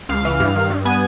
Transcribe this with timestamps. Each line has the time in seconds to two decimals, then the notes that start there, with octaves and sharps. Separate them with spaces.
0.09 C#2 F5
0.25 E3
0.40 G2
0.55 D#3
0.70 G2
0.85 B3 G#5